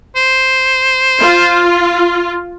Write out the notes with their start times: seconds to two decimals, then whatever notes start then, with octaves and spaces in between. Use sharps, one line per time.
0.16 C5
1.21 F4